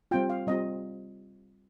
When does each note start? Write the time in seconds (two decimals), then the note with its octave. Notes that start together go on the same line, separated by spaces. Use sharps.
0.11 G3 C4 F4 G5
0.30 F5
0.47 G3 C4 F4 D#5